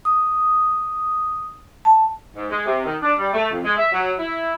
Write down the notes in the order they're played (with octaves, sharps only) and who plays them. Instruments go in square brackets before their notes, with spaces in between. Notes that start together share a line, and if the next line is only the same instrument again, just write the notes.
[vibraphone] D#6
A5
[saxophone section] G#2
G#3
C3
D#3
D4
G3
A3
F2
G#3
E5
F#3
E4